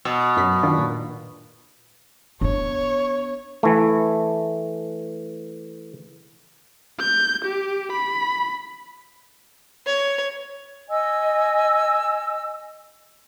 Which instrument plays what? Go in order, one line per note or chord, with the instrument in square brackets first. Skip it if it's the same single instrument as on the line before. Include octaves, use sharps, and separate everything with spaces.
[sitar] B2 [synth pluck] E6
[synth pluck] F#2 F#3 B6
D#3 D4 F4
A#2
[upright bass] B3 D4 [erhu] C#5
[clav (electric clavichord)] E3 A3
[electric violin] G6
G4
B5
[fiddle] C#5
[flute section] D#5 G#5 E6